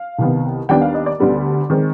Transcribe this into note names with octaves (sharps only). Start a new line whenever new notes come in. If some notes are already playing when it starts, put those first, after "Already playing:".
Already playing: F5
C2 C3 D#3 B3
D#2 D#3 G3 B3 D4 G5
F5
D#5
D5
D2 D3 G3 B3
D#3 G#3 C4